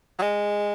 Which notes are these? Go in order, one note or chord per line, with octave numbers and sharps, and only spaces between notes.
F#3
G#3